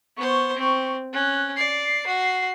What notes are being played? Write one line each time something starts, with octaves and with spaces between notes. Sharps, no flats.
B3 C5 C#6
C4
C#4 F#6
D5 C7
F#4